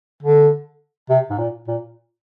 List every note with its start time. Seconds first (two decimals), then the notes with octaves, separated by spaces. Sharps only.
0.22 D3
1.09 C3
1.30 G#2
1.38 A#2
1.67 A#2